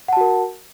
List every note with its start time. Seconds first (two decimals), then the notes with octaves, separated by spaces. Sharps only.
0.08 F#5
0.13 A5
0.17 F#4
0.21 A#4